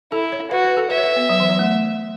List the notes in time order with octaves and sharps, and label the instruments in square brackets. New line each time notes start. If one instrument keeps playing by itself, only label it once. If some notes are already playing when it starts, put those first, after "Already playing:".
[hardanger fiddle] E4 [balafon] A4
[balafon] C#5
[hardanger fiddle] F#4 [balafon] B4
[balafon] B4
A4
[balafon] B4 [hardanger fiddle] E5
[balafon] C#5
B4
B3
F#3
E3
F#3
A3